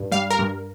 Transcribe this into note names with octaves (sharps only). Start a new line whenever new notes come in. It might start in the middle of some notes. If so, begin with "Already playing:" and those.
Already playing: G2
G3 F5
A#4
G2